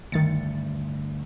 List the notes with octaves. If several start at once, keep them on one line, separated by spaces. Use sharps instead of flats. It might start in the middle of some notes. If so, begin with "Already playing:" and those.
D2 G2 D#3 A6 C#7